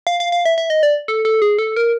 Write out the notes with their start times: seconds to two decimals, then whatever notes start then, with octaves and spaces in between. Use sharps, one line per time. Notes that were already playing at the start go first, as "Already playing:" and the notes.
0.07 F5
0.20 F5
0.32 F5
0.45 E5
0.58 E5
0.70 D#5
0.83 D5
1.08 A4
1.25 A4
1.42 G#4
1.59 A4
1.76 A#4